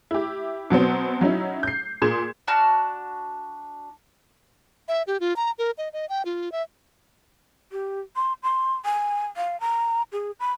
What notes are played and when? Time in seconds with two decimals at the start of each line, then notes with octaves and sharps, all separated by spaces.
0.11 E4 G4
0.70 B2 F#3 B3 C4
1.21 F#3 C#4 D#4 E4
1.63 G6 C7
2.02 A#2 G#4 C6 G#6 E7
2.48 D4 F#4 A5 F6
4.88 E5
5.07 G4
5.20 F4
5.36 A#5
5.59 A#4
5.78 D#5
5.93 D#5
6.09 G5
6.25 F4
6.52 E5
7.72 G4
8.16 C6
8.43 C6
8.85 G#5
9.36 F5
9.60 A#5
10.12 G#4
10.40 B5